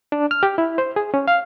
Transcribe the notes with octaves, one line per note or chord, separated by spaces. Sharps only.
D4
F6
G4
E4
C5
G#4
C#4
F5